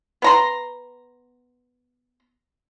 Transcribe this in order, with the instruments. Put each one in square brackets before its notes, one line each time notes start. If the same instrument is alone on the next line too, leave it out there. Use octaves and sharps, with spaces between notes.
[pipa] B3 A#5 C6